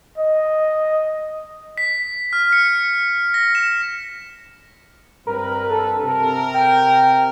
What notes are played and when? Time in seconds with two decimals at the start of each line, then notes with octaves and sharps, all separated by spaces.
0.18 D#5
1.78 B6
2.33 F6
2.53 C#7
3.34 A#6
3.55 E7
5.27 G2 C4 A#4 B4
5.70 A4
6.04 C3 A#4
6.54 G5